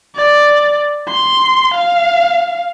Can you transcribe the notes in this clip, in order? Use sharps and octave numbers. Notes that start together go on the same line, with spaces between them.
D5
C6
F5